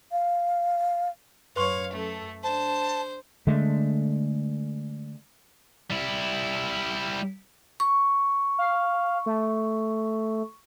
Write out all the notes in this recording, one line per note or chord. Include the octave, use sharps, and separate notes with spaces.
F5
F#2 B4 C#5 F5 C6 C#6
F#2 A3 A4
D4 C5 A5
D3 G#3 A3
G3 E4
C#6
F5
A3